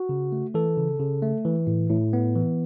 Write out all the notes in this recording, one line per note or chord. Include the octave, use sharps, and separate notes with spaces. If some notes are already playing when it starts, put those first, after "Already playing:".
Already playing: F#4
C#3
A3
E3 A4
C#3
C#3
A3
E3
A2
A2
B3
E3